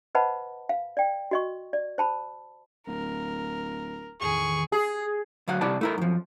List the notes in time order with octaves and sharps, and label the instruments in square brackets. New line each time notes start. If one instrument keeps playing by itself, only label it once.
[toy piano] B4 C5 D#5 F#5 A5 B5
F5
D5 G5
F#4 D#5 C#6
D5
C5 A5 B5
[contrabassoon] D1 [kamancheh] A#4
[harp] E2 A2 D#3 [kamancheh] G#4 [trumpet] C#6
[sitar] G#4
[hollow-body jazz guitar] D2 F#3 F5 F#5
C3 G3 E4 D5 F#5 A5
A3 E4 A#4
F#2 F3